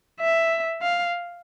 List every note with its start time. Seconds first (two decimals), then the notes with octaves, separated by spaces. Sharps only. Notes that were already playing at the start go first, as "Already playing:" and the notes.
0.21 E5
0.82 F5